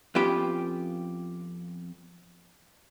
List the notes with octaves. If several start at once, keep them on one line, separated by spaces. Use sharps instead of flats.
F2 B3 C#4 F4 G4 B5